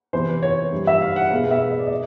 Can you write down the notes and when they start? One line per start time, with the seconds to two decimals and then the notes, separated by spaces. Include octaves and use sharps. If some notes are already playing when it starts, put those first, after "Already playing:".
0.13 E2 C3 E3 C5
0.43 C#5
0.73 G2 E3 G3
0.87 E5
1.02 F5
1.16 F#5
1.31 B2 G#3 B3 F5
1.44 F5
1.51 E5
1.71 D#5
1.79 D5
1.87 D#5